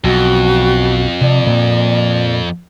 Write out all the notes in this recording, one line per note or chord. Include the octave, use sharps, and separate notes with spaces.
B1 F2 F#4
C3 D5
A#2 A#3